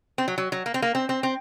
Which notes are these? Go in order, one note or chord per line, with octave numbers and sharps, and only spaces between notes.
C4
F#3
F#3
F#3
A#3
C4
A#3
C4
C4
C4